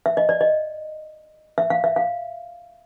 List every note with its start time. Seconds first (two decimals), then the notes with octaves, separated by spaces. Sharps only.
0.06 E5
0.17 D#5
0.29 D5
0.41 D#5
1.58 E5
1.70 F5
1.84 E5
1.96 F5